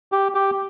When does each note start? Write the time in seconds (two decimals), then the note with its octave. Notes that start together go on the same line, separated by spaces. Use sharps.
0.12 G4
0.35 G4